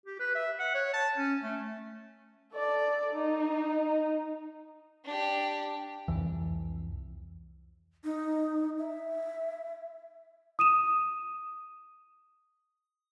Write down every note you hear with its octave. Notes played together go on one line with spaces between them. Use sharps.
G4
B4
E5
F#5
C#5
A5
C#4
A3
A4 D5
D#4
D4 G4
C2 F2 E3
D#4
E5
D#6 D#7 E7